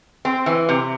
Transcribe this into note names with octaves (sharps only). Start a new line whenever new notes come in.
C4
E3
C3